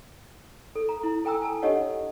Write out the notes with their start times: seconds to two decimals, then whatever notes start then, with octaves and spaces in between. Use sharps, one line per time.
0.75 A4
0.89 A#5
1.03 E4
1.25 A4 G5 G#5 A#5 D#6 E6
1.42 G#5 A5
1.62 D4 G4 A4 C#5 D#5 F#5